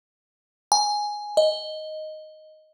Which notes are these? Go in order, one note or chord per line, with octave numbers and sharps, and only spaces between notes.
G#5
D#5